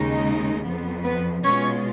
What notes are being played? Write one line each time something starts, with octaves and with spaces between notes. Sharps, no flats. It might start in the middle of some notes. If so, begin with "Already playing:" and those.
Already playing: D#2 C#3 G#3 D#4
F2 F3 B3
B3 B4
B2 G#3 B3 C#4 F4 C#5